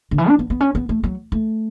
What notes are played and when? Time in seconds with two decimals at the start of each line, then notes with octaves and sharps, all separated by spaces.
0.11 D3
0.18 E3
0.29 D4
0.39 B3
0.50 B3
0.60 C#4
0.75 B3
0.89 A3
1.03 F#3
1.32 A3